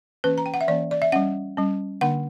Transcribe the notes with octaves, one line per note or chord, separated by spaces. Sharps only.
E3 A#3 C#4 B4
A#5
G5
F#5
E5
E3 A#3 C#4 D5
D5
E5
G3 C#4 F#5
G3 C#4
D3 A#3 D4 F#5